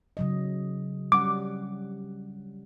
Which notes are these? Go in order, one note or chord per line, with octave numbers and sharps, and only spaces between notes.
C#3 F#3 D#5
G3 C#4 F#5 D6